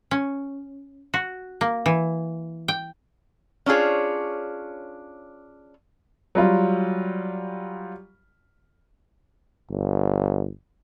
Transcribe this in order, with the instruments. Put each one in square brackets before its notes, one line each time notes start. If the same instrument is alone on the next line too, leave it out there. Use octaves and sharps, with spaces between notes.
[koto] C#4
F#4
A#3
E3
G5
[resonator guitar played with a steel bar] C#4 D4 F4 G#4 C#5
[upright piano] F#3 G3 F4
[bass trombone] G1